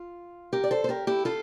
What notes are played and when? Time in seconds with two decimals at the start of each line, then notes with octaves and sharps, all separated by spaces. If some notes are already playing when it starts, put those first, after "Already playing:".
Already playing: F4
0.53 G4 A#4
0.64 D5
0.71 A4 C5
0.84 C5
0.89 G4 A#4
1.07 E4 G4
1.25 F4 A4